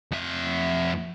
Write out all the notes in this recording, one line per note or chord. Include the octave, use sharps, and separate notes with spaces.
F2 E5